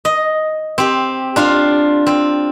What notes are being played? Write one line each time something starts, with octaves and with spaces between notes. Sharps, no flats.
D#5
C4 G4
D4 F4 F5
C4